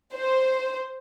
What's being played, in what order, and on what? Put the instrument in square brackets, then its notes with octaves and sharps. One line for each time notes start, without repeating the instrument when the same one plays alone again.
[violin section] C5